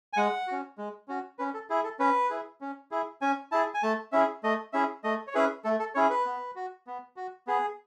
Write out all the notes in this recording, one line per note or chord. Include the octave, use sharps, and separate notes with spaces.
G#5
G#3 F#5
C#4 F#4
G#3
C#4 F#4
C#4 B4
A4
E4 G#4
A4
C#4 B4
E4 G#4
C#4
E4 G#4
C#4 G#5
E4 G#4 A5
G#5
A3 A5
C#4 E4 G#4 E5
A3 D#5
C#4 E4 G#4 E5
A3 D#5
C#5
C#4 E4 G#4 B4
A3 A4
A4
C#4 E4 G#4 C#5
B4
B3
F#4
B3
F#4
B3 G#4